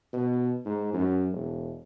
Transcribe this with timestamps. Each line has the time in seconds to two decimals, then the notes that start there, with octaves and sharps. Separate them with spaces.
0.13 B2
0.65 G#2
0.93 F#2
1.32 E1